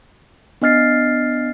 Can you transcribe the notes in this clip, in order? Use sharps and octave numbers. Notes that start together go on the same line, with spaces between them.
B3 D4 D#5 F6 A6 C7